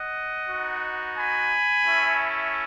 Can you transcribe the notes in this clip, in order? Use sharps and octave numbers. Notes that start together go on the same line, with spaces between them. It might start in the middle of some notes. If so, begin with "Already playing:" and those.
Already playing: D#5 F#5
B3 D#4 F#4
G#5 B5
A3 C#4 E4